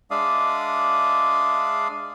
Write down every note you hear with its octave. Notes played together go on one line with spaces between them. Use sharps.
G#3 D4 D5 E5 F5 D#6